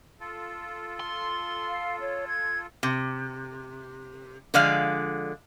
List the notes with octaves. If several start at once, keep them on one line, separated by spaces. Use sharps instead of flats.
F4 A4
C6
F5
C#5
G#6
C3
D3 F3 G#3 D5 F5